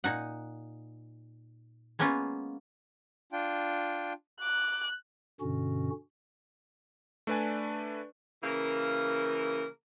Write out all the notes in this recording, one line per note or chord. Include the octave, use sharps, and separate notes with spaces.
A#2 D#4 F#5
G#3 A#3 B3 C#4 F4
D4 F4 G5
D6 F#6
G2 B2 D3 C#4 F#4
A3 D4 B4 D5 G#5
C#3 E3 A#3 A#4